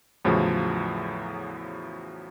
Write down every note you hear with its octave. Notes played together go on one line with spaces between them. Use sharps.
E2 A2 C#3 F3 F#3